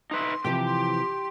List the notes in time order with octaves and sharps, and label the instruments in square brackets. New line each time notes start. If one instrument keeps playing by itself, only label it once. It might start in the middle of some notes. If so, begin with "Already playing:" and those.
[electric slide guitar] D#4 B4 E5 [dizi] C6
[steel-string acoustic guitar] C3 E3 F3 [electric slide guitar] G4
[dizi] C6